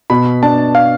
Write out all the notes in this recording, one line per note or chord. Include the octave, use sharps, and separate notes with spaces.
B2 B5
D4 A5
F5